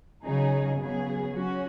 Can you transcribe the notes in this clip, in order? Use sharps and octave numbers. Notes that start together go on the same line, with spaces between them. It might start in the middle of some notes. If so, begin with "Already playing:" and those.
C#3 F#3 D#4 G#4
C#3 F#3 B3 G#4
F#3 C#4 F#4